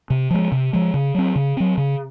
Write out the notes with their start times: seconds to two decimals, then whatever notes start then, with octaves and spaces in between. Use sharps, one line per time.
0.10 C3
0.30 F3 G#3
0.52 C3
0.73 F3 G#3
0.94 C#3
1.15 F#3 C4
1.36 C#3
1.57 F#3 C4
1.77 C#3